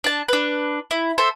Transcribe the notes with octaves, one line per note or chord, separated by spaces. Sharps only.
D4 A5
D4 B4
E4
A4 C5 E5